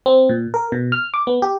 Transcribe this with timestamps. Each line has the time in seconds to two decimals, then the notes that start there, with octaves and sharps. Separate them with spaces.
0.06 C4
0.29 A#2
0.54 A#4
0.72 B2
0.92 F6
1.14 D6
1.27 B3
1.42 G4